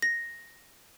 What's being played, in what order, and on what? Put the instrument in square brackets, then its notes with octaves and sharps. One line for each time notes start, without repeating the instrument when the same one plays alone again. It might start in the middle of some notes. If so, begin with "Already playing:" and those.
[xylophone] A#6